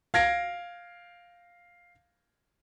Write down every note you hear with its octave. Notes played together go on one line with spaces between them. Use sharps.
F5 G#6 A#6 D7